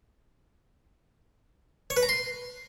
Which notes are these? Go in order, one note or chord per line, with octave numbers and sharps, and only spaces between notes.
C#5
B4
A#5
C6